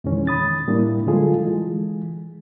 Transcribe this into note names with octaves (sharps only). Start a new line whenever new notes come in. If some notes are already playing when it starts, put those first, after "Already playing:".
F2 B2 D#3 E3 G#3 C#4
B5 D#6 A6
A2 G3 A#3 D4 E4
D3 F#3 G#3 F4 G#4 A4
E3 G#3